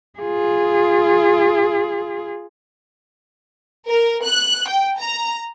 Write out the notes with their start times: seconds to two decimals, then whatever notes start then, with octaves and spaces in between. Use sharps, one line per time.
0.20 F4 G#4
3.88 A#4
4.24 F#6
4.68 G5
4.99 A#5